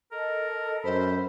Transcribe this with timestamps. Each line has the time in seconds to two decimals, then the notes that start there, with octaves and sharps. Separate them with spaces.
0.12 A4 A#4 D#5
0.84 F#2 C5 B5